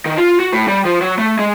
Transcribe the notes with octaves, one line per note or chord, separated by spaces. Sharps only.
D#3
F4
F#4
A2
G3
F3
F#3
A3
G#3